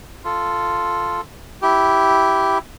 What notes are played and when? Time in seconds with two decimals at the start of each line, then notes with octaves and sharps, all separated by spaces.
0.25 F4 A4
1.62 E4 G4